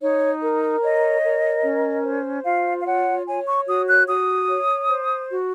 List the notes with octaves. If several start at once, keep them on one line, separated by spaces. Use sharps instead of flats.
D#4 C#5
A#4
C#5 D#5
A#4
C#4
C5
F4 F5
F5
C#5 F#5
C#5 G#5
C#6
F#4 D#6
F#6
F#4 D#6
C#5
C5
F#4